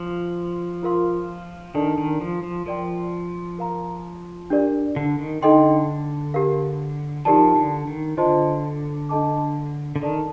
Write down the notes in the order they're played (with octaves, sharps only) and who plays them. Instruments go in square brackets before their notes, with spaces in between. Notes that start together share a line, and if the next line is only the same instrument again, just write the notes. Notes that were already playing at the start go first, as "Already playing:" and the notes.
Already playing: [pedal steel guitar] F3
[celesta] F4 A#4 F5 C6
[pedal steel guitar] D#3 [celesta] D4 A4 D5 A5
[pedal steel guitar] D#3
F3
F3
[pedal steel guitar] F3 [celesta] A#4 D5 G5 C6
[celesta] A#4 F5 A#5
D4 G4 A#4 D5
[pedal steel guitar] D3
D#3
[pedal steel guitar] D3 [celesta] D#4 A4 D#5 G5 C6
[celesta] G4 A#4 F5
[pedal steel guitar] F3 [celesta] D#4 G4 A#4 D5 A5
[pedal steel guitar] D3
D#3
[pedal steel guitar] D3 [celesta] F4 C5 D#5 A5 C6
[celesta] D4 A4 D#5 A5 D6
[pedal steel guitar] D3
[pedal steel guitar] D#3 [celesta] A4 D5 A5